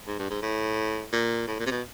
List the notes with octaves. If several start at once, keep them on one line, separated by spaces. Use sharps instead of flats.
G#2
G2
G#2
A2
A#2
A2
A#2
C3
B2